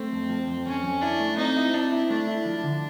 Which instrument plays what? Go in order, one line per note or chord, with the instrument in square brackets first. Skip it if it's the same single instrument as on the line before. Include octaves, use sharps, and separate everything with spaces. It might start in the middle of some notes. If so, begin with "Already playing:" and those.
Already playing: [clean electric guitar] A3 [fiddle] C4
[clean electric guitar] F2
F3
F2
[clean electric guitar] F2 [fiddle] C#4
[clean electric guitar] F2
[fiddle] D4 [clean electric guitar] E4
[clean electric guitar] A3
[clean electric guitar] C4 [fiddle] D#4
[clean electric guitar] E4
[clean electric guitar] C4 [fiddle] D4
[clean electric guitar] E4
[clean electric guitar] A3 [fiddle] D4
[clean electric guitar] E4
F3
D3